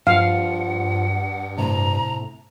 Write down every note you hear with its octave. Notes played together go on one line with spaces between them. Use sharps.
G2 F3 F5 F#5
A2 C3 A#5